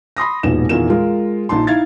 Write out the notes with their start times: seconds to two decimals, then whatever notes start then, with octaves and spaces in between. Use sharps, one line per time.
0.17 B5 C6 D#6 A#6
0.43 E1 A#1 G#2 B3 E7
0.69 E2 A#2 D#3 E3 A#3 E7
0.90 G#3 F4 A#4
1.49 A#1 D#4 A5 C6
1.67 D#4 E4 F5 G#6 A6